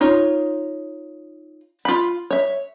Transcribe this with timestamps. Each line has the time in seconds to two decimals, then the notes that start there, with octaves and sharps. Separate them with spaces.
0.01 D#4 F4 C#5
1.85 F4 B5
2.31 C#5 E5